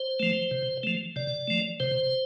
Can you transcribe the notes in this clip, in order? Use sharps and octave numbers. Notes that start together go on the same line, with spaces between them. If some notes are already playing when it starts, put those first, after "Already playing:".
Already playing: C5
F3 A3
C3
F3 A3
C3 D5
F3 A3
C3 C5